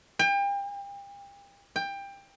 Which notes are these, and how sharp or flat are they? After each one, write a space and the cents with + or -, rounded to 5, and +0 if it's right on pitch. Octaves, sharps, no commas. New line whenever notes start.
G5 +35
G5 +20